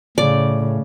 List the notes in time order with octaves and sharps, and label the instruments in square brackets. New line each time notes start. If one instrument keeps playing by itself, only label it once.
[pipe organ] A2 [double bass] C#3 [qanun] D5